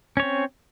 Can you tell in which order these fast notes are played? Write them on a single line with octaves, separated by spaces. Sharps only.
C#4 C#5 C4